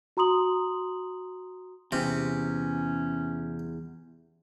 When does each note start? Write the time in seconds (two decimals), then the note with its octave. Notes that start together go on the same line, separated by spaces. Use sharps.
0.17 F#4 A#5 C6 D#6 F#7
1.92 E2 C3 C#4